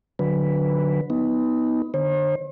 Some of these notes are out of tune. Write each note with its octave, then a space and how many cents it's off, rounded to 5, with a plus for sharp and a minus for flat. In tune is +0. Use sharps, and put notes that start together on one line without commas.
D3 +0 F#3 -20 B4 +0
B3 +5 D#4 +20
D3 +25 C5 +45